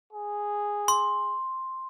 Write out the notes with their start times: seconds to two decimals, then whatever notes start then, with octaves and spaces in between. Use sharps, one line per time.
0.13 G#4
0.88 C6